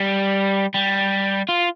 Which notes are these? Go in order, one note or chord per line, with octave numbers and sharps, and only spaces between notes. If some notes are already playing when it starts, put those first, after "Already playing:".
Already playing: G3
G3
F4